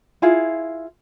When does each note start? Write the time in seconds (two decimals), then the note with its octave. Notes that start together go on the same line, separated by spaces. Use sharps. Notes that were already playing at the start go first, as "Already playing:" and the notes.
0.22 E4 F4 G#4 F5